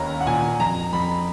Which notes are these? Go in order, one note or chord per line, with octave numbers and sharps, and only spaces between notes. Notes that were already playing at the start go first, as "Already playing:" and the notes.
Already playing: D#2 C#4 A#5 B5
F#5
A#2 G#5
F2 A#5
F2 B5